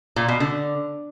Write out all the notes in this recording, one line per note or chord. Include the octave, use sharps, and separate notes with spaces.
A#2
B2
D3